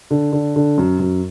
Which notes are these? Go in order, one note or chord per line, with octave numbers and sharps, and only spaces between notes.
D3
D3
D3
F#2
F#2